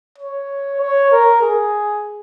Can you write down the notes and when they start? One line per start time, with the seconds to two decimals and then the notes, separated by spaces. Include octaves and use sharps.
0.18 C#5
0.81 C#5
1.12 A#4
1.42 G#4